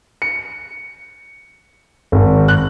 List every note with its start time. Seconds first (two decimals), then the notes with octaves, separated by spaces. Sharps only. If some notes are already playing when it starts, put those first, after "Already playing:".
0.22 C#7
2.12 G#1
2.48 F#6